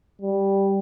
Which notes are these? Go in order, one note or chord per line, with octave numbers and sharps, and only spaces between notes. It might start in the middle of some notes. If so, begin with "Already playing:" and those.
G3